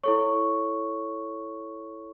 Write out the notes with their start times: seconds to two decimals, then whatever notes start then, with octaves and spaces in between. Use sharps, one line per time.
0.04 E4 A4 C#5 C#6